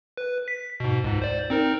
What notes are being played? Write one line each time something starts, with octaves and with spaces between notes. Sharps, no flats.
B4
B6
G#2 B2
C#2 G#2
C5 D5
C4 D#4 A#4